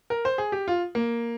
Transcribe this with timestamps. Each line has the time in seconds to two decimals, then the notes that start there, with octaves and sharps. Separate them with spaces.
0.10 A#4
0.25 C5
0.38 G#4
0.52 G4
0.68 F4
0.95 A#3